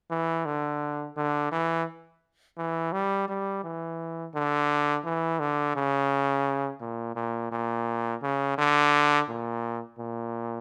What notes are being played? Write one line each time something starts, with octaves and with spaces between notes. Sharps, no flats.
E3
D3
D3
E3
E3
G3
G3
E3
D3
E3
D3
C#3
A#2
A#2
A#2
C#3
D3
A#2
A#2